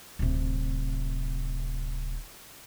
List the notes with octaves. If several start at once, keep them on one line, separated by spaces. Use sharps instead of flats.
D1 C3